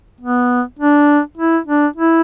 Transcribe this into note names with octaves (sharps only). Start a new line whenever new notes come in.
B3
D4
E4
D4
E4